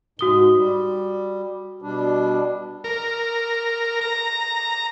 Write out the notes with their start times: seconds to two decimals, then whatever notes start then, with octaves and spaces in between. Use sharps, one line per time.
0.19 G#2 F#4 D#6 G7
0.57 G3
1.82 B2 G3 D4
2.84 A#4
4.01 A#5